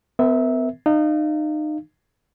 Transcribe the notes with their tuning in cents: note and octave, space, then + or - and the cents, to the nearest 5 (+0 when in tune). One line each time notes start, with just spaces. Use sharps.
B3 +40 A#4 +0 E5 -15
D#4 -30 F5 -25